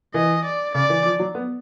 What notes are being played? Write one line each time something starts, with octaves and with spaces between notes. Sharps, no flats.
E3 D#5
D5
C#3 D5
E3
F3
F#3
B3